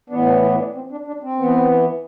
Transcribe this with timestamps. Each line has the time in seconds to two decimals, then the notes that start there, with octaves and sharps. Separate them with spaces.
0.10 A2 E3 B3 D4
0.26 D4
0.42 E4
0.54 E4
0.59 D4
0.75 C4
0.91 D4
1.07 D4
1.23 C4
1.39 E3 B3